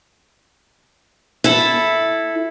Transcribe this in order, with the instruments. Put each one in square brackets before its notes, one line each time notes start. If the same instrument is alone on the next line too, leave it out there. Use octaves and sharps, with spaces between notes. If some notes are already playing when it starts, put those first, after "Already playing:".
[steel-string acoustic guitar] E4 A4